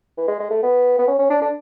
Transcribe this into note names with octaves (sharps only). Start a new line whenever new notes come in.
E3
G#3
G#3
A3
B3
B3
C#4
C#4
D4
D4